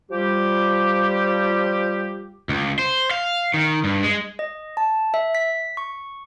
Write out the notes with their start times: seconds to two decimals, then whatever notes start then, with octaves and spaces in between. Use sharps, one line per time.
0.11 F3 G3 G4
2.49 C#2
2.79 C5
3.11 F5
3.54 D#3
3.84 G2
4.03 G#3
4.39 D#5
4.77 A5
5.14 E5
5.35 B6
5.77 C#6